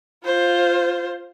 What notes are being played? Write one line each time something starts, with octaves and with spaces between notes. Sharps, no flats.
F4 C5